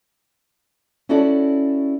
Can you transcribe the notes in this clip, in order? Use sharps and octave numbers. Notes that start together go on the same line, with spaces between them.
C#4 E4 F#4 A4 D5